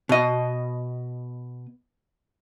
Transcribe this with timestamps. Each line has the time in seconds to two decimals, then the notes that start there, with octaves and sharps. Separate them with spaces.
0.09 B2 D#5